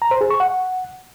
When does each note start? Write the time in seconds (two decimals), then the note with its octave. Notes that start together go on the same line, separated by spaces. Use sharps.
0.02 A#5
0.11 C5
0.21 G#4
0.30 C#6
0.40 F#5